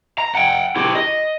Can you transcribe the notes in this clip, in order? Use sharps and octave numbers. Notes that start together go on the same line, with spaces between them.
A#5
F#5 G5
E4 G4
D#5